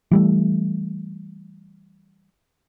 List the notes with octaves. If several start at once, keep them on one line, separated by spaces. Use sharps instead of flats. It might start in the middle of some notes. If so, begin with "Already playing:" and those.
E3 G3 A3